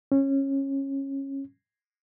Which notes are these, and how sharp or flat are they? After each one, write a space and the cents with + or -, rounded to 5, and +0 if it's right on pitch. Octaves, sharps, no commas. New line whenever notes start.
C#4 -20